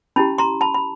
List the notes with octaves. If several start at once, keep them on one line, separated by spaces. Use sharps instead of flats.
C#4 E4 G4 A5 B5
A#5 C6
A5 B5
B5